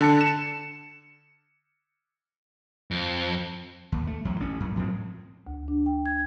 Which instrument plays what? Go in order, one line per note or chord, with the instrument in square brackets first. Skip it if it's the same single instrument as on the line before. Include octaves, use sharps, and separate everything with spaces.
[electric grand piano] D3 A5 C#7
E7
[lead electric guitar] F2
[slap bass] D#2
A3
E2 F#3
A1 C#4
F#2
A2 F3 F#3 C4
[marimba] D2
D4
G5
G#6